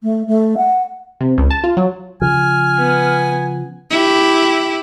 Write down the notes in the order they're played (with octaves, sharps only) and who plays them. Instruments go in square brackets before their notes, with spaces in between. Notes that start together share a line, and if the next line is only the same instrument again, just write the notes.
[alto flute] A3
A3
F#5
[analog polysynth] C3
C#2
A5
F4
F#3
[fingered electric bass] C#3 F3 [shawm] G#5 [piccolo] F6
[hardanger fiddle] B3
[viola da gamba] E4 G4